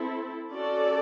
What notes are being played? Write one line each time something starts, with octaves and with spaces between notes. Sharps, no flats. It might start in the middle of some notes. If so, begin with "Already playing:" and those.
Already playing: C4 E4 A4
C#4 F#4 A4 D5